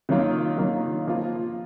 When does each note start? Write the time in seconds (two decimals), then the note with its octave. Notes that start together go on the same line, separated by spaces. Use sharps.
0.09 D#3 F#3 A#3 F4
0.58 D#3 F#3 A#3 F4
1.07 F3 A#3 F4